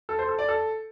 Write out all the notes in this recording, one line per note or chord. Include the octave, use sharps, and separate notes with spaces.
A4
C5
A4
D5
A4